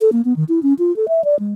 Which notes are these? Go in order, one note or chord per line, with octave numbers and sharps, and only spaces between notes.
A4
A#3
B3
D#3
E4
C#4
F4
A4
E5
D5
G#3